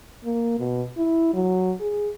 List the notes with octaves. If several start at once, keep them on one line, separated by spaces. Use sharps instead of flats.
A#3
B2
E4
F#3
G#4